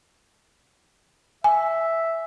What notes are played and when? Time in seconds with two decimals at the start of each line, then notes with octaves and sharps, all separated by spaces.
1.44 E5 G#5